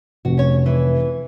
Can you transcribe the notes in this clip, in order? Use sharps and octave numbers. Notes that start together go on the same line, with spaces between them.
F1 F#4
C#4 C#5
E3